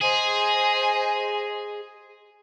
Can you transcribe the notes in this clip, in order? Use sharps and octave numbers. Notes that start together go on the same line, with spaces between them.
G#4 C5 D#5 G#5